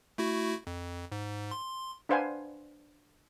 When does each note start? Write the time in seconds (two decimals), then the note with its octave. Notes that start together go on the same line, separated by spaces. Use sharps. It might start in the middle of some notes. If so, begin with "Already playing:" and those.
0.18 A3 E4 F#4
0.67 F2
1.12 G#2
1.51 C6
2.09 D4 B4 C5 F5 F#5 G#5